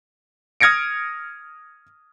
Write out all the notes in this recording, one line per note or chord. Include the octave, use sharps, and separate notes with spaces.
D#6 F6 G#6 A#6 C#7 D7